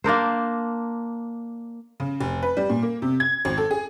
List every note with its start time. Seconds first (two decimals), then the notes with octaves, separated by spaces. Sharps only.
0.04 A#3 D4 A#4 C5
2.00 C#3
2.20 F1
2.42 B4
2.57 G3
2.70 A#2
2.82 A#3
3.02 C3
3.20 G#6
3.45 G#1
3.58 A4
3.71 G#4